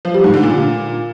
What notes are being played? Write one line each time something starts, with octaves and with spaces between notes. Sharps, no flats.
F3
G3
G#2
D3
A#2